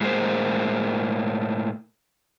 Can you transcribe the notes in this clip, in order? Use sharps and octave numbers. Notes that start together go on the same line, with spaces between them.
A2 G#3 A#3 C5